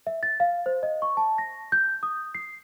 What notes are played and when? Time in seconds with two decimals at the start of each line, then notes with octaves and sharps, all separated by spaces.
0.07 E5
0.23 A6
0.40 F5
0.66 C5
0.83 D#5
1.02 C#6
1.17 A5
1.38 A#6
1.72 G6
2.03 D#6
2.35 C7